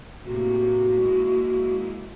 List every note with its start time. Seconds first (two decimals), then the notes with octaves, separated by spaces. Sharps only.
0.25 A2 C3 A#3 F#4
0.99 G#3 A#3 E4